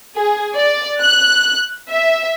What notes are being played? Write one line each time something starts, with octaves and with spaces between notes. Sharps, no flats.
G#4
D5
F#6
E5